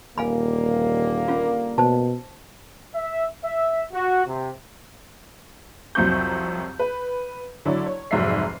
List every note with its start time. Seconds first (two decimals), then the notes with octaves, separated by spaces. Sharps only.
0.18 D#1 D3 G3 A#3 F5 G#5 B5
1.28 C#4 F4
1.78 B2 C5 A5
2.94 E5
3.43 E5
3.93 F#4
4.26 C3
5.95 C2 F2 F#3 C4 C#6 G6
6.79 B4
7.65 D3 F#3 E4 C#5 D5
7.86 C#5
8.11 F1 G#2 F#3 D5 E5 C7